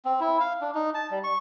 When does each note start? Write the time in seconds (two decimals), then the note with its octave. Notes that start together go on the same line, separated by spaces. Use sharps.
0.05 C4
0.20 E4
0.40 F5
0.61 D4
0.75 D#4
0.94 A5
1.11 G3
1.24 C#6